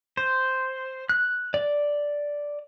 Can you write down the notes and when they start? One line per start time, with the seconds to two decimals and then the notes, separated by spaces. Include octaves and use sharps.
0.17 C5
1.09 F#6
1.54 D5